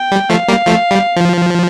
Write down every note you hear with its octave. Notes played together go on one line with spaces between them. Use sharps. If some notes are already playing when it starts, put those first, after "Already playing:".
Already playing: G5
G3
F3 A3 F5
G3 A#3
F3 A3
G3
F3